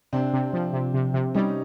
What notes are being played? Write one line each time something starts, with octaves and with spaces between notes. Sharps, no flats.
C3 C4 D4
C3
F3
C3
C3
C3
G3 C#4 D#4